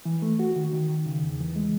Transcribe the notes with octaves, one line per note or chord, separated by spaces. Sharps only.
E3
A3
F#4
D#3
D#3
D#3
C#3
E2
E3
G#3